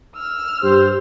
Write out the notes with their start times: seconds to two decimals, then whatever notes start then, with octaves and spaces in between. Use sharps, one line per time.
0.15 E6 F6
0.63 G2 G4 C5